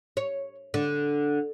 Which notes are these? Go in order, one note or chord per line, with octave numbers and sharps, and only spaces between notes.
C#5
D3